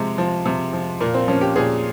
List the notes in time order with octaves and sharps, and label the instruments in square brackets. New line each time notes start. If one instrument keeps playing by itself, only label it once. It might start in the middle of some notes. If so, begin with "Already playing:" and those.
Already playing: [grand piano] C3 F3 G#3
F3
C3
F3
A#2 A#3
C4
F3 C#4
G4
A#2 G#4